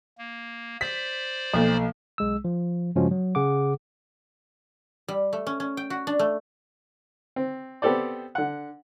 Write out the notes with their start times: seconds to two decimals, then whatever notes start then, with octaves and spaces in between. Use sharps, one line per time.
0.18 A#3
0.81 C5 D5 B6
1.54 B1 F3 A#3 A4
2.18 B1 G#3 E6
2.45 F3
2.95 G2 C#3 F3 G#3 C#4 F#4
3.11 F#3
3.35 C#3 G#4 F#5 D6
5.08 G3
5.33 A3
5.47 C#4
5.60 C#4
5.77 G5
5.90 F#4
6.07 D4
6.19 A3
7.36 C4
7.82 B3 C4 G4 A4 C5 D5
8.35 D3 F#5